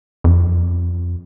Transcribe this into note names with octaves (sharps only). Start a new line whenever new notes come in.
F2